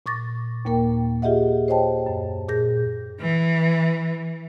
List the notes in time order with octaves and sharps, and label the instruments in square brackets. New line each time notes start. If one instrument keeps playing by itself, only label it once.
[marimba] A#2 C#6 D6 A6 A#6
D#2 A#2 A#3 A#4 G5
F4 G4 G#4 D#5 E5 F#5
C5 C#5 D#5 G5 A5
F#2
A#2 G#4 G6 A#6
[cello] E3